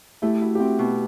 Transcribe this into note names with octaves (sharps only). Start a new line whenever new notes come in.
A3 E4 G4
E4 F#4
G4
C4 F#4
B2